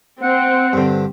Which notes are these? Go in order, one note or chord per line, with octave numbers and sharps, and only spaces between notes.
C4 F#5
G2 D3